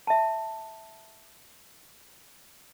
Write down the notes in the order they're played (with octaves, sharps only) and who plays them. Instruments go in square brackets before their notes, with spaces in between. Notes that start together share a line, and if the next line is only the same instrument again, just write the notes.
[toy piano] E5 A5